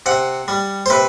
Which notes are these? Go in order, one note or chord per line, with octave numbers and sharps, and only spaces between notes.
C3 F#5
G3
C5
C3 B4